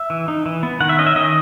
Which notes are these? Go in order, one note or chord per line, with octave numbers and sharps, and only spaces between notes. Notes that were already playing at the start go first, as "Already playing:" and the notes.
Already playing: E5
E3
D#4
E3
B3
D#3 F#5
E5
C#4 D#5
E5
D#3 D#5